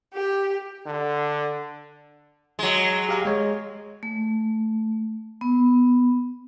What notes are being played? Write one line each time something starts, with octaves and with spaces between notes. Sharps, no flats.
G4
D3
F#3 G#3
G4 F5 A#5
G#3 C#5
A3
B3